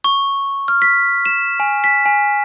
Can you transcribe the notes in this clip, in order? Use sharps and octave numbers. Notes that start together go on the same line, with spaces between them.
C#6
F6
B6
E7
G#5
B6
G#5